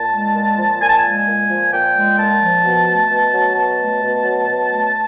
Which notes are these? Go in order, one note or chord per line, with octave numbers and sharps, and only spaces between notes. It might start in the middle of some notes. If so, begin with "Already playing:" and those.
Already playing: A#2 A5
G#3
A#2
F3
A#2 G#5
A5
G#5
G#3
A#2
F3
A#2 G5
G#3
A#2 A5
F3
B2
A3
B2
F#3
B2 A5
A3
B2
F#3
B2
A3